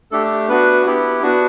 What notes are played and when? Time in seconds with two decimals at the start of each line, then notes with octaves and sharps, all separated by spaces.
0.12 A3 D4 G4 A4
0.49 B3 D4 F#4 B4
0.86 B3 E4 G4
1.23 B3 D4 F#4